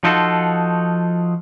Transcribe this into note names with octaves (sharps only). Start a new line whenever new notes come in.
F3 D#4 F4 F#4 A4